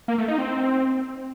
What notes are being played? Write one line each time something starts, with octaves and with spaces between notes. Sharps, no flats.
A#3
A3
D#4
C4